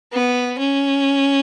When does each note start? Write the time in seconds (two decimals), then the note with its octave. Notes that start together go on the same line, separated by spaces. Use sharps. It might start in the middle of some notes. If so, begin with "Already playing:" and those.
0.12 B3
0.59 C#4